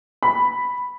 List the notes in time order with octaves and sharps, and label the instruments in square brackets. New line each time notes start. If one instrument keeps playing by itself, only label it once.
[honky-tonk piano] B5